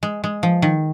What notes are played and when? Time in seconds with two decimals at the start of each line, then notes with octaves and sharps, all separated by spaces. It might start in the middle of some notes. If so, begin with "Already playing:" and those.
0.03 G#3
0.24 G#3
0.43 F3
0.62 D#3